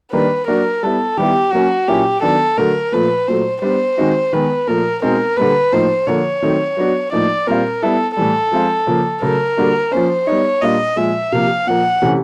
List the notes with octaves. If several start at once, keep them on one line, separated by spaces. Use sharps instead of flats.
D#3 G3 A#3 D4 B4
F#3 A#3 D4 F#4 A#4
G3 B3 E4 A4
D#3 G3 B3 E4 G4
F#3 A#3 C#4 F#4
A#2 F#3 A#3 C#4 E4 G4
D#3 F#3 B3 D4 A4
D3 F#3 A3 A#4
A#2 F3 A3 B4
A#2 F#3 A3 C5
G3 B3 D4 C5
D#3 G#3 C4 D#4 F#4
D#3 G#3 B3 B4
A#2 F3 A3 A#4
B2 G#3 C4 D#4 A#4
D3 G3 A#3 B4
A2 F3 A#3 D#4 C5
D3 F3 A#3 C#5
D#3 F#3 A3 C4 D#4
F#3 B3 D4 F#4
A2 F3 A#3 D#4 D5
A#2 G3 C4 F4 A#4
G3 B3 E4 A4
A2 E3 G3 A4
F3 G#3 C4 F4
C#3 F3 A#3
C#3 F#3 A3 A#4
D3 G3 A#3 D4 F#4
F3 A#3 C#4 C5
G3 B3 D#4 C#5
A#2 G3 A#3 D4 F4 D#5
A#2 F3 G#3 E5
C3 F3 A#3 F5
A#2 F3 A#3 F#5
C3 E3 A3 C#4